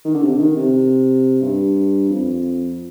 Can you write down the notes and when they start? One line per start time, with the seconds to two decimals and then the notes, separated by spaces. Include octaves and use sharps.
0.05 D#3
0.14 D3
0.23 C3
0.31 D3
0.39 D#3
0.57 C3
1.42 G2
2.10 F2